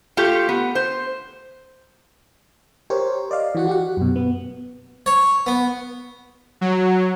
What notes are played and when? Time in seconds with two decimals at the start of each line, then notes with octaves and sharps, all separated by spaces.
0.17 A3 F4 G4 A4
0.49 B3
0.75 C5
2.90 G4 A#4 C5 C#5
3.31 D5 D#5 F5
3.55 E3 F#4 F#5
3.67 F#4 G4 F#5
3.97 F#2 B2
4.16 B3
5.06 C#5
5.46 B3
6.61 F#3